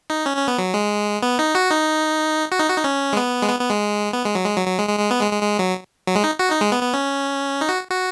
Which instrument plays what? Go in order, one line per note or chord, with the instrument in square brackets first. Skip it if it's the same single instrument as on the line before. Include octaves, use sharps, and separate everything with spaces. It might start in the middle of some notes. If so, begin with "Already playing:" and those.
[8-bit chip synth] D#4
C#4
C#4
B3
F#3
G#3
B3
D#4
F#4
D#4
F#4
D#4
F#4
D#4
C#4
G#3
B3
G#3
B3
B3
G#3
B3
G#3
F#3
G#3
F#3
F#3
G#3
G#3
G#3
B3
G#3
G#3
G#3
F#3
F#3
G#3
D#4
F#4
D#4
G#3
B3
B3
C#4
D#4
F#4
F#4